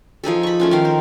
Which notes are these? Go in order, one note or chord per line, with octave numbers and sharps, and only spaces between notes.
F3 D#4 G#4 A4
B5 C#6
A3 C#4 F4
D#3 D#4 A#4 F5
C5